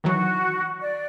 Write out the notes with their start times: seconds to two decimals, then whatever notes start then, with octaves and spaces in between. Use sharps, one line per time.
0.04 D#3 E3 F#3 F#4
0.81 D5